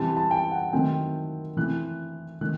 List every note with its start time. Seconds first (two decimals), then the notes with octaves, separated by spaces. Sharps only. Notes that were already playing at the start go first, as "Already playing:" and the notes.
Already playing: E3 G3 C4 A5
0.17 A5
0.31 G5
0.51 F#5
0.73 D#3 F#3 A3 C4 G5
1.57 E3 A3 C4 F#6
2.41 D#3 A3 F#6